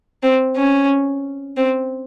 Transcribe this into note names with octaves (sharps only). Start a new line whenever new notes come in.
C4
C#4
C4